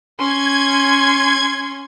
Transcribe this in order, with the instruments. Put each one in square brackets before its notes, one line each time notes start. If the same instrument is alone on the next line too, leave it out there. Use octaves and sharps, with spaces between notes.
[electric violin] C#4 C6 [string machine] G#6